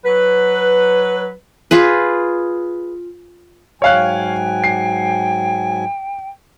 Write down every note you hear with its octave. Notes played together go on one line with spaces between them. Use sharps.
F#3 B4
F4 G#4 B4
G#2 F#3 C#5 F5 G5 G#5 F#6
C7